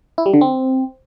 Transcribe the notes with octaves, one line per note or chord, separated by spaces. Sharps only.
E4
G3
D3
C4